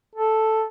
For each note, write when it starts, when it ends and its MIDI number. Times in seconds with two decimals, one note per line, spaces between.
0.15 0.64 69